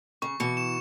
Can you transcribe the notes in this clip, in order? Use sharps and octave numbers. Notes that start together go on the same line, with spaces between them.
C#3 C#6
B2 E3 C#7
E7